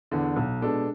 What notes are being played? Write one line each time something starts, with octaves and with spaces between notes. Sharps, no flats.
E2 D3
B1
B2 G#3 D4 A4